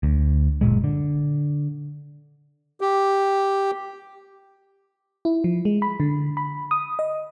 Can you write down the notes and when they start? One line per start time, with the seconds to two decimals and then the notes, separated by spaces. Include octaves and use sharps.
0.03 D2
0.61 F#1 D#2 A#2 G#3
0.84 D3
2.81 G4
5.25 E4
5.44 F3
5.65 G#3
5.82 B5
6.00 D3
6.37 B5
6.71 D#6
6.99 D#5